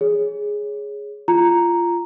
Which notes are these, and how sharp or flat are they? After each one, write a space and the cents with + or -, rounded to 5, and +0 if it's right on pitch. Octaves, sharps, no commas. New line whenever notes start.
G#4 +0 C#5 +0
F4 -15 A#5 +0